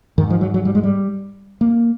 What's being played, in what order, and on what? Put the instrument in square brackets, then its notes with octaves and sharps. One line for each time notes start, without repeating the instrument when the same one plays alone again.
[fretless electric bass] G#2 D#3
F3
F#3
F#3
G3
G#3
G3
A#3